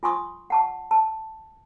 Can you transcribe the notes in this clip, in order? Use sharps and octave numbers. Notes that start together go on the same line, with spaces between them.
F4 G#5 C6 C#6 D#6
F#5 A5 C#6
A5